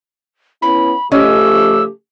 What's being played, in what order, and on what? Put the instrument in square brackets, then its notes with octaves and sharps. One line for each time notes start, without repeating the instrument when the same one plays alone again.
[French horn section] B3 C#4 E4 [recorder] B5
[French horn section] C#3 F3 A3 [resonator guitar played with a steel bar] C#4 D#5 [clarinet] G4 [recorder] E6